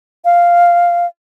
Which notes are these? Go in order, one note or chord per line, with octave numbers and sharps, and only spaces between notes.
F5